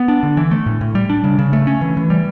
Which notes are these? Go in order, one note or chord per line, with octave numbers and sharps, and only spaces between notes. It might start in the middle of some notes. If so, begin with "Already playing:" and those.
Already playing: B3
D4
D3
E3
A3
A2
A2
G3
D4
C#3
C#3
A3
C#4
E3
E3
G3